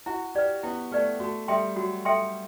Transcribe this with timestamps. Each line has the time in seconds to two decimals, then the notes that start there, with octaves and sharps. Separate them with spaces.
0.06 E4 F#4
0.35 G4 B4 D5
0.63 B3 E4
0.92 A3 B4 D5
1.20 A3 F#4
1.48 G3 A4 E5 G5 C6
1.76 F#3 F#4
2.05 A4 E5 G5 C6